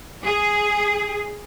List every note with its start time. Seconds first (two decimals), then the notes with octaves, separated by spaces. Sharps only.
0.25 G#4